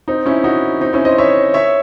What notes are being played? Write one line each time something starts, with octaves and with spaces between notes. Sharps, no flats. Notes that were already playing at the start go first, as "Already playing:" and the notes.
C4 D#4
C#4 E4
D#4 F#4
C4 D#4
C#4 E4
C5 D#5
C#5 E5
C#5 E5